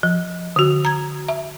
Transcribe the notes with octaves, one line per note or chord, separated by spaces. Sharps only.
F3
D3 F#4
A#5 G#6
E5